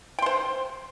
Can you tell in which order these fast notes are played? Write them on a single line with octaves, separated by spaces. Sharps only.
G5 C6 C5